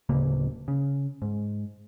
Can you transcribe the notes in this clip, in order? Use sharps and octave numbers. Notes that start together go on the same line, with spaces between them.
D1 C#3 A#3
C#3
G#2